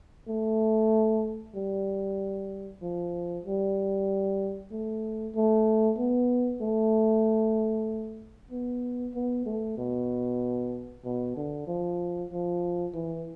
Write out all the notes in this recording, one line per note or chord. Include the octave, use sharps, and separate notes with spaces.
A3
G3
F3
G3
A3
A3
B3
A3
B3
B3
A3
B2
B2
D3
F3
F3
E3